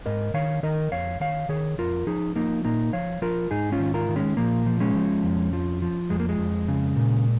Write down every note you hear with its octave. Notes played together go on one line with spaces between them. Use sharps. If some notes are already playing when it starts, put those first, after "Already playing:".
G#2 A#4 D#5
D#3 C#5 F5
D#3 A#4 D#5
F2 C#5 F5
D#3 C#5 F5
D#3 G#4 C#5
F2 F4 A#4
F3 D#4 G#4
F3 A#3 D#4
A#2 A#3 D#4
F3 C#5 F5
F3 F4 A#4
G#2 D#4 G#4
C#4 F4
D#3
F4 A#4
D#3
G#3 C#4
A#2 F3 A#3
F3
G#3 C#4
F3
F2
F3
F3
F2 G#3
A#3
G#3
F2
C#3
A#2